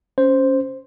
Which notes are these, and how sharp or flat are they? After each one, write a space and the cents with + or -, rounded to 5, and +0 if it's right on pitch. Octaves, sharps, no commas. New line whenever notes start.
C#4 +0 C5 +0